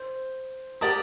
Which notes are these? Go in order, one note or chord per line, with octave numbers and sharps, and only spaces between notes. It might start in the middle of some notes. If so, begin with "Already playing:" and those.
Already playing: C5
G4 A#4 D5 A5 D#6